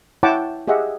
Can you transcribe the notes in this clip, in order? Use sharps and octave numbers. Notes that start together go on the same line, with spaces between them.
E4 C#5 F#5 G5 A5 D6
G4 G#4 D#5 E5 F#5